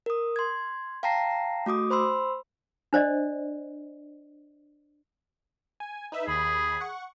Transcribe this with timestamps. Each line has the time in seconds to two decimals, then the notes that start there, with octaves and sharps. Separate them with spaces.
0.06 A#4 D#6
0.36 C6 G#6
1.03 F5 G5 A5 A#5 A#6 C7
1.66 A3 F#4 D6 D#6
1.90 C5 B5 C6 E6
2.93 D4 C5 D5 D#5
5.80 G#5
6.12 D#4 B4 E5
6.27 D#2 G#4 B5
6.80 F#5 C#6